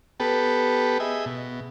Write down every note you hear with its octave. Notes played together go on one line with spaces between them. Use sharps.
B3 G4 A4 B4
G#4 D#5 E5
B2